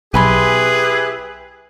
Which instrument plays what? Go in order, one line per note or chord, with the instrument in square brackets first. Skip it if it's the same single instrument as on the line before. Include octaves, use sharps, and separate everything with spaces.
[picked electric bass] B1 [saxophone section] E4 G4 B4 [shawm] G#4 [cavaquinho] G#5 B5 C6